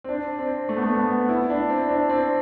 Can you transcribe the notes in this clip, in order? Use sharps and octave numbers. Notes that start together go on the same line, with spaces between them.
C4
D4
C4
A3
B3
A3
B3
E4
D4
C4
D4
C4